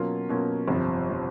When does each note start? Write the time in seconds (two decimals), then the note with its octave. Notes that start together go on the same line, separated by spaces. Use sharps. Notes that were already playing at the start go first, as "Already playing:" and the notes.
Already playing: B2 F#3 A#3 C#4 F4
0.29 B2 F#3 A#3 C#4 F4
0.68 G1 F2 C3 F3
1.09 C3 F3